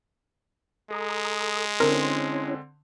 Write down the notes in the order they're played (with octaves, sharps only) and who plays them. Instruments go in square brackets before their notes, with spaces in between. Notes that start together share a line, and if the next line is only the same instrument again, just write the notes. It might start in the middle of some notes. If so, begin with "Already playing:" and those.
[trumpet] G#3 [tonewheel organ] A4 A#5 D#6
[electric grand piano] D3 C4 C6 [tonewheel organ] C#4 E4 C#5 [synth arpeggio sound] A#4